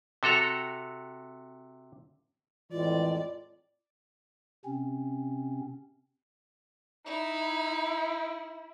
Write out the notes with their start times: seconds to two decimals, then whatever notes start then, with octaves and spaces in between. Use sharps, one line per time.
0.23 C3 F#4 A4 A#5
2.72 F2 A2 E3 G#3 F4 D5
4.65 C3 C4 C#4
7.06 D#4 E4